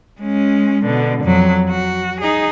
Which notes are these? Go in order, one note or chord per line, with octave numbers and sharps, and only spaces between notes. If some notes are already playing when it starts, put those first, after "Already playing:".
G#3 C#4
B2 D3
F2 F#3
F#4
D#4 G#4